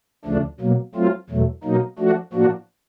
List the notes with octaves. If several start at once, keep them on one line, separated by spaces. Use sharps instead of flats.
D2 C#3 F3 A3 D4
B2 F#3 A#3
F#3 A3 C4 F4
E2 B2 F#3 A3
B2 F#3 A#3 D#4
F3 A3 D4 F#4
A2 F3 A#3 D4 F#4